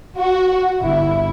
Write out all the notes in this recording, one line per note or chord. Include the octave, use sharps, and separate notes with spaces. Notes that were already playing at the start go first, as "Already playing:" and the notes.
F#4
G1 E4